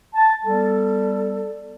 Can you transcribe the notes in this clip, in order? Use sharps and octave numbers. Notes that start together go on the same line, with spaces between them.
A5
G3 B3 A4